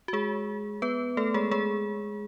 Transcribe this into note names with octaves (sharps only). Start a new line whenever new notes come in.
F#4
G#3 G#4
B3 B4
A3 A4
G#3 G#4
G#3 G#4